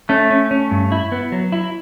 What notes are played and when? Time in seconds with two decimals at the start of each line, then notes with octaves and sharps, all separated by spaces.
0.09 A3 C#4
0.30 C#4
0.51 C#4
0.71 G2
0.92 E4
1.12 B3
1.32 F#3
1.52 E4